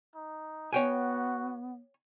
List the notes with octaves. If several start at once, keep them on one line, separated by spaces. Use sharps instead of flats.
D#4
B3 F#4 C#5 G5 G#5